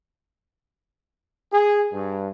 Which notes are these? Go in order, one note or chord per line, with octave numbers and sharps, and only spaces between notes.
G#4
G2